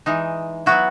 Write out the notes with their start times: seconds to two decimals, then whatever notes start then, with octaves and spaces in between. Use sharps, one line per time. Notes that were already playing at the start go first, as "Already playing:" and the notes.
0.06 E3 G#3 D#4
0.66 F#3 B3 E4 F#4